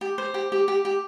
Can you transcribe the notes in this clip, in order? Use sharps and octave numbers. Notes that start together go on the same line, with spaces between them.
G4
C5
G4
G4
G4
G4